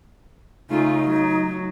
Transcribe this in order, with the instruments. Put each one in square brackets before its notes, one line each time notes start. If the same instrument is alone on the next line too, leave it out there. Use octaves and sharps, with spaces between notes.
[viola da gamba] C#3 A3 F4 [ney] D#4
[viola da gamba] F#3